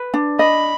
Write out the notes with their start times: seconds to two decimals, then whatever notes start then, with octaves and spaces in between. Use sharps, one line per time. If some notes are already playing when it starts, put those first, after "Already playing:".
Already playing: B4
0.14 D4
0.39 D#5 B5